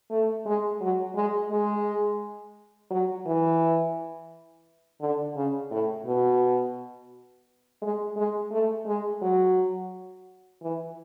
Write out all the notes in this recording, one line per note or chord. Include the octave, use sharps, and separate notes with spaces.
A3
G#3
F#3
G#3
G#3
F#3
E3
D3
C#3
A2
B2
G#3
G#3
A3
G#3
F#3
E3